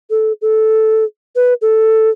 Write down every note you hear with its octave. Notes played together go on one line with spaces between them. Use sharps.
A4
A4
B4
A4